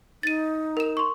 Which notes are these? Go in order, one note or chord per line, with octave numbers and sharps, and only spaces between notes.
D#4 A6 D#7
A#4 E7
C6 C#6